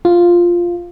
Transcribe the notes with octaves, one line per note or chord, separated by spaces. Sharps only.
F4